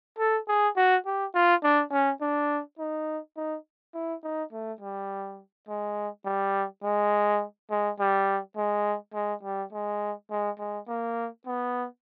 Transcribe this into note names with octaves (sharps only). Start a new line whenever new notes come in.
A4
G#4
F#4
G4
F4
D4
C#4
D4
D#4
D#4
E4
D#4
A3
G3
G#3
G3
G#3
G#3
G3
G#3
G#3
G3
G#3
G#3
G#3
A#3
B3